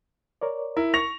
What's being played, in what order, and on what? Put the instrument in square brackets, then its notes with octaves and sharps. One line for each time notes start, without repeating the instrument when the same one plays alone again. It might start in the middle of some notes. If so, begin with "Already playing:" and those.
[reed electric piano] A#4 C#5 D5
[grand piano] E4 [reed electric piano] A#4
[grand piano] C#6 A#6 F7